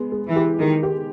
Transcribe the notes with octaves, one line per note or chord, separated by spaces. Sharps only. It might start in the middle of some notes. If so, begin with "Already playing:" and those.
Already playing: G#3 B3
G#3
E3
G4
D#3 G#3
G4